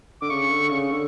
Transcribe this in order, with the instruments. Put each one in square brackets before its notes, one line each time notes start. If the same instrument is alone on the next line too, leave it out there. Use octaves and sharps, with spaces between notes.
[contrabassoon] D3 [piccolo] D6
[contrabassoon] C#3 [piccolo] C#6
[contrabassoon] D3
C#3
D3